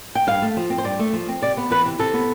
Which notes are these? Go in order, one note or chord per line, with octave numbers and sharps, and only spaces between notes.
G5
G2 F5
A3
F3
C4
C5
G2 D5
A3
F3
C4
C3 D5
B3
E3 B4
C3
C3 A4
B3